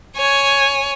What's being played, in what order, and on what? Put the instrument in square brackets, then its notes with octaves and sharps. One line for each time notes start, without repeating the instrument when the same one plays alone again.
[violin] C#5 G#5